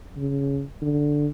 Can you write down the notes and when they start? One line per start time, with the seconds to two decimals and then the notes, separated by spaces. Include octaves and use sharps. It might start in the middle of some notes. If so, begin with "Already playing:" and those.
0.17 C#3
0.82 D3